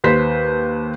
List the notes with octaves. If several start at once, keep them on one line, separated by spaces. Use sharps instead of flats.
D#2 B4 C5 B6